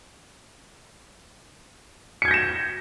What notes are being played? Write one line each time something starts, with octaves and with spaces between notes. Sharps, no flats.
G6 G#6 A#6 C#7 E7